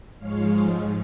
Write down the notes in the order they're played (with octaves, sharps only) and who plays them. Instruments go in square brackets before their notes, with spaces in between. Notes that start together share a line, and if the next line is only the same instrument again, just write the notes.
[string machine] G#2 F3 G#3 C#5 F5